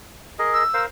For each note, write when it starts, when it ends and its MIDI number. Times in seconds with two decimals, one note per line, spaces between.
0.39 0.63 68
0.39 0.63 70
0.39 0.63 75
0.53 0.83 88
0.74 0.86 70
0.74 0.86 72
0.74 0.86 77